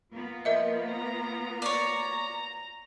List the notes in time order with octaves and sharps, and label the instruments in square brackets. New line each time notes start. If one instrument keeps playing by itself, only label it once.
[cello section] A#3 B3 F4
[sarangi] F3 [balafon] A#4 D#5 E5
[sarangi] A#5
[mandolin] C#5 D5 [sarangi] A#5